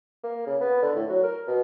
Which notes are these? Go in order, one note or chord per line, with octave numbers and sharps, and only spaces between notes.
A#3
C#3
B3
D3
A2
F#3
A#4
B2